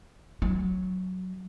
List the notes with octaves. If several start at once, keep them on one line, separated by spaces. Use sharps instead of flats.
F#3